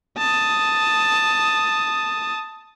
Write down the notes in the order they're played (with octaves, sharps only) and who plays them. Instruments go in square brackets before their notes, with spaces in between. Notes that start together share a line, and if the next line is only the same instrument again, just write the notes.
[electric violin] A5 D#6